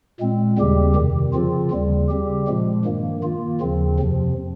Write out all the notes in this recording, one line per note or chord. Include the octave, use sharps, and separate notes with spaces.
A#2 G#3 C4
D#2 C#3 G3 C4 G4
F2 C3 D#3
C#3 F3 C4 F4
D#2 C#3 G3
C#3 G3 C4 G4
A#2 F3 G#3
G2 D#3 A#3
D#3 A#3 F4
D#2 C#3 F3 C4
F2 C3 F3